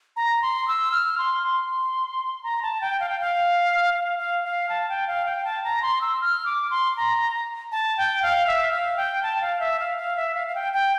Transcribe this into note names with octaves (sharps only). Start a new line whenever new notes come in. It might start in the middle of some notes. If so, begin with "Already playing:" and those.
A#5
C6
E6
F6
C6
C6
A#5
A5
G5
F5
G5
F5
F5
F5
F5
A5
G5
F5
G5
A5
A#5
C6
E6
F6
D6
C6
A#5
A5
G5
F5
E5
F5
G5
A5
F5
E5
F5
F5
E5
F5
F5
G5
G5